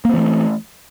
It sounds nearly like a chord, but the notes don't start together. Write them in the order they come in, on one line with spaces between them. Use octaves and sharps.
A#3 C4 E3 A3